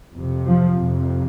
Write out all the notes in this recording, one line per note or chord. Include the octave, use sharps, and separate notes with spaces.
F2 C3
F3
F2 C3